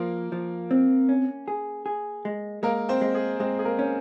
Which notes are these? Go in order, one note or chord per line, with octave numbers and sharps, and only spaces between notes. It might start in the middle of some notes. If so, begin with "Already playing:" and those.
Already playing: F3 A#3 A#4
F3
C4
C#4
G#4
G#4
G#3
G#3 A#3 A#4
C4 C5
G#3
G#4
G#3 C4 C5
G#4
A#3 A#4
C#4